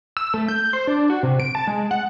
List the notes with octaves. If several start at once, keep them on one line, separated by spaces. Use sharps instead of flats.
E6
A3
G6
C5
D4
F#4
C3
D7
A5
G#3
F#5